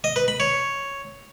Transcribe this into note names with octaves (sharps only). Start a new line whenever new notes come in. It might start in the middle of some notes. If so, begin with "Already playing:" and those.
D#5
B4
B5
C#5